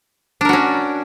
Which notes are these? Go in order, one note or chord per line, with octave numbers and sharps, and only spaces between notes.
C#4 D4 F#4 A#4